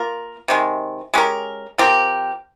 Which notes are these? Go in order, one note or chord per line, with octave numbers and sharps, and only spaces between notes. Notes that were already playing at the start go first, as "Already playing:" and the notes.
Already playing: A#3 F4 A#4
C3 D#3 G#3
G#3 C#4 G4 A#4
F3 C4 G4 A#4